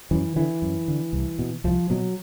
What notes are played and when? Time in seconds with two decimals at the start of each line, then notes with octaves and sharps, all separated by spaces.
0.11 F#2 E3
0.36 D3 E3
0.62 F#2
0.88 D3
1.13 C2
1.39 B2
1.64 C2 F3
1.90 B2 F#3